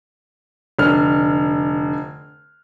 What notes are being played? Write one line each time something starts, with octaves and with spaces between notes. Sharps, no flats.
F1 D3 F6